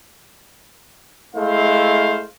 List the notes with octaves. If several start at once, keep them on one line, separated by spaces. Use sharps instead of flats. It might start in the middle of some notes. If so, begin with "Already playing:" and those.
G#3 A3 E4 C5 F5